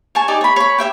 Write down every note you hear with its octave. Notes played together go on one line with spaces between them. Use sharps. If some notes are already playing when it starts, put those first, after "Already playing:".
C#5 G#5 A5
D#4 G4 D5
C#5 B5
C#5 B5
G4 C5 E5 G5